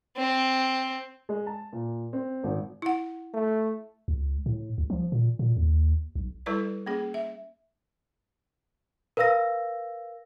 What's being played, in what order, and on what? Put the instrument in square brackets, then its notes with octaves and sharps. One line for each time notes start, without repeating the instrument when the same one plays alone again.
[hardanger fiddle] C4
[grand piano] G#3
A5
A#2
C4
G#1
[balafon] E4 F#5
[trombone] A3
[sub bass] C#2
A2
C#2
F3
A#2
A#2
D#2
B1
[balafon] G3 E4 A4 B4 D5
A#3 C#4 G#4
E5
[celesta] A#4 B4 F5 E6 A#6